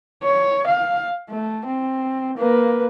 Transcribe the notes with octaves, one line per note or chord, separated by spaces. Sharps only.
C#5
F5
A3
C4
A#3 B4